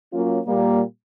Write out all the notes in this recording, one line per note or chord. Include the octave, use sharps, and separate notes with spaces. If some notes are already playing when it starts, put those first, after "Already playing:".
F#3 A#3 C#4 F4
A#2 G3 A#3